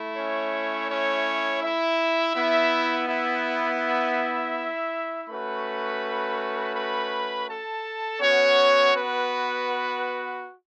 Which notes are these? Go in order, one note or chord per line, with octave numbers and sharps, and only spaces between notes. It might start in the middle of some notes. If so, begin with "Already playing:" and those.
Already playing: A3 E4
C#4 C#5
C#4 C#5
E4 E5
B3 E4
E4 E5
A3 C#4 F#4 B4 B5
B4 B5
A4 A5
B3 C#4 F#4 C#5
B3 B4